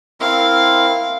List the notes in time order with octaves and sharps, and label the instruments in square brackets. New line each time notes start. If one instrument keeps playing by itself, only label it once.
[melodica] C4 E4 A#4 [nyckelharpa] F5